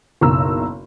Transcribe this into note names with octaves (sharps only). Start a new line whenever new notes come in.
F#1 B1 A#5 E6